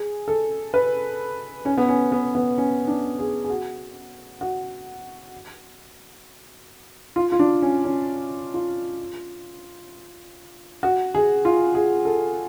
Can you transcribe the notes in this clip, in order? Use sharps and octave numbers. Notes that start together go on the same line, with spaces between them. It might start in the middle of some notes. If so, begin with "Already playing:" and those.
Already playing: G#4
A4
B4
C#4
B3
C#4
B3
B3
C#4
D4
G#4
G#4
F#4
F#4
F4
F4
D4
C#4
C#4
F4
F#4
G#4
F4
G#4
A4